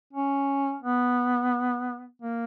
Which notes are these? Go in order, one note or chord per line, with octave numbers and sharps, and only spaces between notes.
C#4
B3
A#3